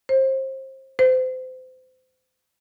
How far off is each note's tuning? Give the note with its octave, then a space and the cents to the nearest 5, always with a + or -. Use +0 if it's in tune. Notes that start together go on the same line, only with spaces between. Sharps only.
C5 +30
C5 -30